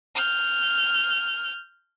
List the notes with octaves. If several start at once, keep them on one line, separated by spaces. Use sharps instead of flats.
F6 G6